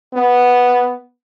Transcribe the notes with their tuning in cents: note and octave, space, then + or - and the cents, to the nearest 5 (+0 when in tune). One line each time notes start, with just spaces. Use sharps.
B3 -5